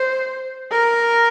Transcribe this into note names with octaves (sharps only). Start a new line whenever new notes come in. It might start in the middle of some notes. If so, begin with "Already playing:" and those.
Already playing: C5
A#4